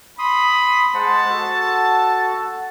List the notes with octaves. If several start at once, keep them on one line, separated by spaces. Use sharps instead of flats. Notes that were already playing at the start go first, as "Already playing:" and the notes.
B5 C6 D#6
G#3 C5 F#5 A5
F#4 A4